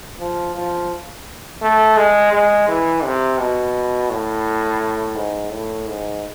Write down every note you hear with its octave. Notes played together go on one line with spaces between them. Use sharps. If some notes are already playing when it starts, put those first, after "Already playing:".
F3
F3
A3
G#3
G#3
E3
C3
B2
A2
G#2
A2
G#2